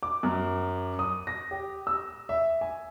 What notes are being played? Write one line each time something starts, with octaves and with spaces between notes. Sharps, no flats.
D6
F#2
D#6
A#6
G4
E6
E5
G#5